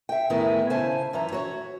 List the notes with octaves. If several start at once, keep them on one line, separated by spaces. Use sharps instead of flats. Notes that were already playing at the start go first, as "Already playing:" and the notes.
E5 G5
A2 D#3 B3 E4 G#4 A#4
C#3 E4 C5 G#5 A5
F#2 E3 E5 A#5
F#4 C#5